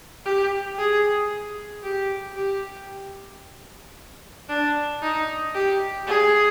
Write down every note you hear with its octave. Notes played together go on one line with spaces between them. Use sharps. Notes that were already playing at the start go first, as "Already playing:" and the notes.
G4
G#4
G4
G4
D4
D#4
G4
G#4